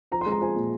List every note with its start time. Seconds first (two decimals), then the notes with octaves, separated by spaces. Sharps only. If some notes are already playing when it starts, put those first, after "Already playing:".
0.11 F3 A#5
0.21 C6
0.26 G#3
0.32 A#5
0.41 F3 G#5
0.56 A#2